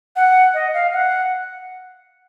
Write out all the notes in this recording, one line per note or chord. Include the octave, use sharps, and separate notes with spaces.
F#5
D#5
F5
F#5